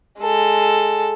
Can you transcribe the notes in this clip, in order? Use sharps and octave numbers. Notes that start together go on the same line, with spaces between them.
G#3 A4